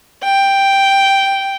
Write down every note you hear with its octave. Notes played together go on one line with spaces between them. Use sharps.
G5